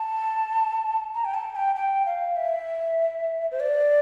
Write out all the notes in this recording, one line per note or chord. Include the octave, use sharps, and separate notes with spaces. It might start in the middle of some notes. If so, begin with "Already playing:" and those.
Already playing: A5
A#5
G5
A5
G5
G5
F5
E5
C5
D5